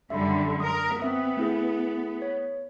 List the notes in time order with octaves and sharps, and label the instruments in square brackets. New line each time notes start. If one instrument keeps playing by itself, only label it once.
[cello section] F#2 D3 G3 [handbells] E5 B5
[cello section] A#4 [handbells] D#6
[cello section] B3 [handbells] C4 E5 D#6
[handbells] A3 E4 G#4
C#5